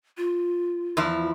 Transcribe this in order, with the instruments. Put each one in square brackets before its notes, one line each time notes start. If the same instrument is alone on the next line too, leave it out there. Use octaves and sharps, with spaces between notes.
[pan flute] F4
[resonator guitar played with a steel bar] E2 F3 E4